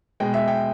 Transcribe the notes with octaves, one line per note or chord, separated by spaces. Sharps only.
B2 G#3 G5
E5
G5